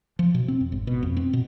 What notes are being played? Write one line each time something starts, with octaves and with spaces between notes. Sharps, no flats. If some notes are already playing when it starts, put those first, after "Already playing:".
F3
B2
C4
F2
G#1
B2
F2
C4
B2